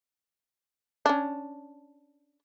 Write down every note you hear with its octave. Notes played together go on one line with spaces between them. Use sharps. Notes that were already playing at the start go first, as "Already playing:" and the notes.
C#4 D4